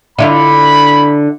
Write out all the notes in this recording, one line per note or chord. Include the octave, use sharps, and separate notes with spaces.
D3 E4 F4 B5